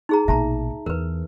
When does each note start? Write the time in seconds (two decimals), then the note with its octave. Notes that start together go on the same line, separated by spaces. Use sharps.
0.09 D#4 G#4 A#5
0.28 A#1 B2 E5 A5 A#5
0.86 E2 A#4 B4